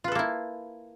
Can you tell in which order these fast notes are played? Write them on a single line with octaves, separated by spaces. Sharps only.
F4 B4 A4 A#3 E4